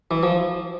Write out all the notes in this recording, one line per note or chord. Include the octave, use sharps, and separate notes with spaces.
E3
F3